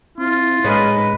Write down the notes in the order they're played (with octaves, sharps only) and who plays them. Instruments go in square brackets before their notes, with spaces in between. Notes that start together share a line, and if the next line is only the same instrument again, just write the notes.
[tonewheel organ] C4 E4 [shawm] F4
[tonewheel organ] A2 [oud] G#3 C#4 [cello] D#4 B4